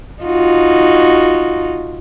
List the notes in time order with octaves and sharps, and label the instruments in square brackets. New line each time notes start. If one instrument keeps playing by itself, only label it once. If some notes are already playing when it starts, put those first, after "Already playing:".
[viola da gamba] D#4 F4 F#4